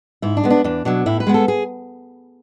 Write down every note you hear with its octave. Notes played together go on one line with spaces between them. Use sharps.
G#2 E4
D4
G#3 B3
D4
E2 D4
B2 F#3 D4
A2 E4
B4
G#3 B3
A4
G#4